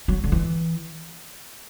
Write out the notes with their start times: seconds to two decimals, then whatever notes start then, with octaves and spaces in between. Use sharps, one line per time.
0.08 F#3
0.24 D3
0.32 E3